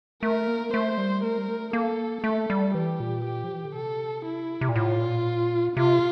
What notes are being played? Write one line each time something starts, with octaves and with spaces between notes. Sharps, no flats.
A3 A#4
A#3
A3 C5
G3
A3 A#4
G3
A3
A#3 A4
A3 A4
G3
E3 G4
A#2
G4
F3
E3
D3
C3 A4
E4
C3
A#2
A2 F4
A#2
C3 F4